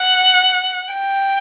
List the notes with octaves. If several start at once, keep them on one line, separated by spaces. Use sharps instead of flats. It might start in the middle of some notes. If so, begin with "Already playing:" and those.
Already playing: F#5
G5